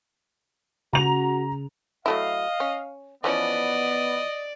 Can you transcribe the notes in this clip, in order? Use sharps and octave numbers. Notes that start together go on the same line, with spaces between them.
C#3 F#4 A#5 F7
F#3 A3 E4 D#5 F5
C#4
E3 F3 B3 C#4 D5 D#5